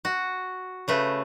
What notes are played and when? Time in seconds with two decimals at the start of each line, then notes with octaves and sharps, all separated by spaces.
0.05 F#4
0.88 C#3 A3 B4